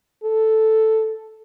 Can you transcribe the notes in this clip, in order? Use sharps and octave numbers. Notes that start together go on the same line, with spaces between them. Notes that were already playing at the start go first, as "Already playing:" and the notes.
A4